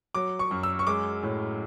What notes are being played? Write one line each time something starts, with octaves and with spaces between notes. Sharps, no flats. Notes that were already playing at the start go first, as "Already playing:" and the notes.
F#3 D6
C#6
F#2
E6
C#6
G#3 D6
A2